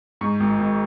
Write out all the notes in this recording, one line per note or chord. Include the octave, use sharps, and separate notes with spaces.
G#2 C#6
G#1
G#1